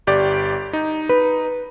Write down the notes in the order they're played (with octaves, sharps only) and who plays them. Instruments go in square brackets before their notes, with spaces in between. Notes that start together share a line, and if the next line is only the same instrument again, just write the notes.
[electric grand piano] G1 G4 D5
D#4
[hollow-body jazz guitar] B4